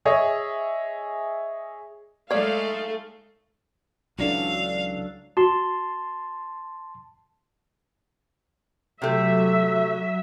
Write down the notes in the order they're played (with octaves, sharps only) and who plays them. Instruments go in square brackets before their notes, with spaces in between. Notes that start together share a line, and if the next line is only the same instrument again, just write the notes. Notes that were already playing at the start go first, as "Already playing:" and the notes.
[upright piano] G#4 C#5 D#5 E5
[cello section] G#3 [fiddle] A3 [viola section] D#4 A4 F5 [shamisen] C#5 D5
[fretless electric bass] C#2 E3 [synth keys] F#3 D4 A4 [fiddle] F5
[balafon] F#4 [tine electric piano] A5 C6
[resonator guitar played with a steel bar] C3 A3 [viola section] F#3 E5